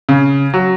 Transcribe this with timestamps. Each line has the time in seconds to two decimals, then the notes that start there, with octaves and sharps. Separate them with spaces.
0.09 C#3
0.54 F#3